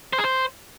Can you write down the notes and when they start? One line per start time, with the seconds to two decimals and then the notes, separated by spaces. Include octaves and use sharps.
0.13 C5
0.18 G#4
0.24 C5